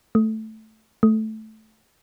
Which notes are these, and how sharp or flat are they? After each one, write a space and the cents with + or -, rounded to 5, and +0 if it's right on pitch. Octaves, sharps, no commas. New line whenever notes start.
A3 -5
A3 -10